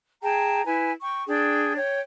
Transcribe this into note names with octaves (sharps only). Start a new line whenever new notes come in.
G#4 G5 A5 A#5
E4 B4 G#5
G5 C#6
D4 G#4 G5
C#5 G5